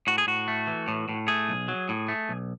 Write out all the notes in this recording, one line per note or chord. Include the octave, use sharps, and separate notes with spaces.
A2 F#4
G#4
A2 F#4
A3
E3
A2
A2
A3 G#4
B1
F#3
A2
A3
B1